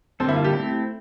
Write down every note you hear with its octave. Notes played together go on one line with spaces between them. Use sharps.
D3 G3 A#3 C4 D4 A4
E4
F4
G4
A3 C4 E4